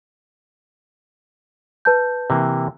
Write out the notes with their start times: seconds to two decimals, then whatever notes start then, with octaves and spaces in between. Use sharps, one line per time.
1.85 B4 A5 G6
2.30 C3 E3 A#3